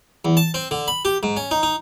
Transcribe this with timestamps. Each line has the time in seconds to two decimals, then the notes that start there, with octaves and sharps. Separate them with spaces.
0.25 E2
0.37 A5
0.54 C4
0.71 D3
0.88 B5
1.05 G4
1.23 G#2
1.37 C#4
1.51 D#4
1.63 D#4